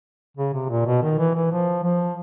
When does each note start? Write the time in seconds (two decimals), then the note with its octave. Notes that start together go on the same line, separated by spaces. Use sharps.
0.37 C#3
0.53 C3
0.69 A#2
0.86 B2
1.02 D#3
1.19 E3
1.35 E3
1.51 F3
1.84 F3